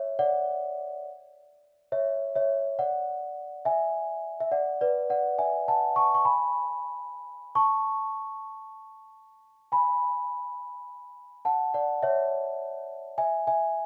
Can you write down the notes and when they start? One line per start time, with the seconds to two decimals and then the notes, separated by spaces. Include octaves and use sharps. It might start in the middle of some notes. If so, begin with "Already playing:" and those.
Already playing: C#5 E5
0.19 D5 F#5
1.92 C#5 E5
2.35 C#5 E5
2.79 D5 F#5
3.65 E5 G#5
4.41 E5
4.52 D5 F#5
4.81 B4 D5
5.10 D5 F#5
5.39 E5 G#5
5.68 F#5 A5
5.96 A5 C#6
6.15 C#6
6.25 G#5 B5
7.55 A5 C#6
9.72 G#5 B5
11.45 F#5 A5
11.74 D5 F#5
12.03 C#5 E5
13.18 E5 G#5
13.47 E5 G#5